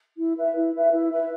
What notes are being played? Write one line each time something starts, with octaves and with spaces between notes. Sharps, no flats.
E4
B4 E5
E4
B4 E5
E4
B4 E5